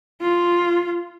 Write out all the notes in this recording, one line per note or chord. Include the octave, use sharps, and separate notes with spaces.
F4